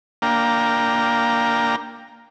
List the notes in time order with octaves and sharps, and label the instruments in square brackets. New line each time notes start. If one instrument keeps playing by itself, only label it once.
[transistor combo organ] A#3 D4 F5 G5 A#5